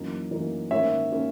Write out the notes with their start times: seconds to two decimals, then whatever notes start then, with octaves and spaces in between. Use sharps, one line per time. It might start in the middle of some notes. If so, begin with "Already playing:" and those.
Already playing: F#2 E3 A#3 D#4
0.31 F#2 E3 A#3 D#4
0.71 G#2 D#3 A#3 C#4 C#5 E5
1.12 D#3 A#3 C#4